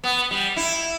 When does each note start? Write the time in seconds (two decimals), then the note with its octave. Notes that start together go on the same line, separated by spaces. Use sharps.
0.04 B3
0.31 G3
0.56 E4